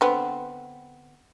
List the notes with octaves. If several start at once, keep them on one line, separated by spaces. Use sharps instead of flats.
D3 B3 C4